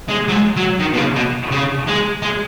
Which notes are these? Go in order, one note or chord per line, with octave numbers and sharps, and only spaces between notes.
G#3
F#3
G#3
F#3
D#3
B2
C#3
B2
C#3
G#3
G#3